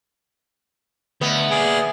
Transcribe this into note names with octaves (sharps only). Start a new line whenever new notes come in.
D2 B3 E4
D#2 G#4 D5